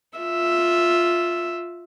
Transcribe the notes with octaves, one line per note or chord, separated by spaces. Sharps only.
F4 E5